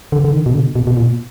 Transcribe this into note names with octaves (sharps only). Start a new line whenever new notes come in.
D3
D3
D#3
B2
D3
B2
B2
A#2